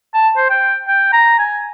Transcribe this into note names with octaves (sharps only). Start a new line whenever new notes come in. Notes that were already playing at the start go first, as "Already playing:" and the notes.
A5
C5
G5
G5
A#5
G#5